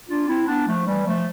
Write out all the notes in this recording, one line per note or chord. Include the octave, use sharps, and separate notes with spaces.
D4 F4
C4 E4
B3 D4
F3 A3
E3 G3
F3 A3